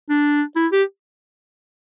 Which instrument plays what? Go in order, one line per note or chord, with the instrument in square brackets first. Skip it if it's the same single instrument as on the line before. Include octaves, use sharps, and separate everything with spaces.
[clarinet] D4
E4
G4